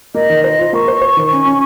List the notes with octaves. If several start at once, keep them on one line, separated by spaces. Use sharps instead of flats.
A#3 D#5
D#3
C5 D#5
F4
A#3 C#6
C5
C5
D#3
C#4
C#4